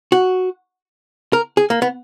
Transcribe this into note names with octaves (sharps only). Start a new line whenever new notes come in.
F#4
A#4
G#4
A#3
B3